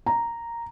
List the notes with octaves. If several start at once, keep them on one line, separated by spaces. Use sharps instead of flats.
A#5